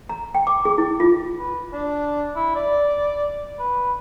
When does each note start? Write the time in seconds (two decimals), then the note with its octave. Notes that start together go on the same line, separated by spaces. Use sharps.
0.09 A#5
0.35 G5
0.47 D6
0.65 G#4
0.78 E4
1.00 F4
1.38 B4
1.73 D4
2.36 E4
2.55 D5
3.59 B4